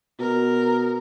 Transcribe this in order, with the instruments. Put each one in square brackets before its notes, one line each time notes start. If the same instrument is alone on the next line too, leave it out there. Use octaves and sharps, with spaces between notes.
[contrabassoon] B2 [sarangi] A#4